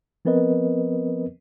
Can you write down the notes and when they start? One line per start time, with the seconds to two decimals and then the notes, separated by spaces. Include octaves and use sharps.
0.25 F3 B3 C4 A#4 B4 D#5